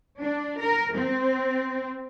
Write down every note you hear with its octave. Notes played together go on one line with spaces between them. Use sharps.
D4
A#4
C4